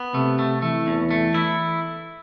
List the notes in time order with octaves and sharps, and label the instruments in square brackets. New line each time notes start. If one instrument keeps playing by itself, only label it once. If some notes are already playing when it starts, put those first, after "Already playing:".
Already playing: [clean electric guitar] B3
[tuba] C3 [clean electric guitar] A3
[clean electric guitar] A3
[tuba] E3 [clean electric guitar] A3
[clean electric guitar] E2
A3
E4